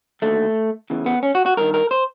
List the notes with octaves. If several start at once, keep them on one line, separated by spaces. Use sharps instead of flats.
D#2 D3 A3
E2 C#3 E3
B3
C#4
F#4
F#4
G2 D#3 A#4
A#4
C5